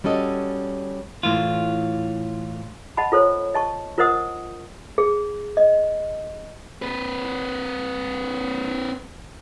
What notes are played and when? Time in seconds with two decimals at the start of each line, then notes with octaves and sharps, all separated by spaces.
0.04 G3 C#4 F#4 A4 D#5
1.23 A2 E3 F4
2.97 D#5 F#5 A5 B5
3.12 F4 A4 C5 C#5
3.54 D#5 A5 C#6
3.98 F4 A#4 C5 D#5 F#5 D#6
4.98 G#4
5.57 D#5
6.82 C4 B4